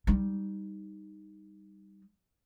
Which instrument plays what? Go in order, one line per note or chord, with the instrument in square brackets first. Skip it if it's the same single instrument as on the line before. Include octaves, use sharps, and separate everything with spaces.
[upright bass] G3 D#4